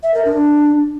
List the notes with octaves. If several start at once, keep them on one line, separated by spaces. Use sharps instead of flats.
E5
A#4
D4